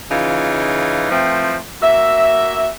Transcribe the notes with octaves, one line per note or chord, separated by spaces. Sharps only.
C#3 E3 D#4 F4
E3 F3 A3 C4
A#3 F#4 E5